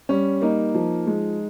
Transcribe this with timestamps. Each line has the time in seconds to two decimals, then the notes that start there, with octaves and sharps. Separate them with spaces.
0.09 G3 C#4
0.42 A#3 D#4
0.75 F3
1.07 G#3